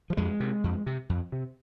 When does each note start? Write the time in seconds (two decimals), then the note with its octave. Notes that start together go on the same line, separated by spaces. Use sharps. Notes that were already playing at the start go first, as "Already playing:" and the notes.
0.10 F3
0.17 F2 G#3
0.40 C3
0.64 F2
0.86 C3
1.09 F2
1.32 C3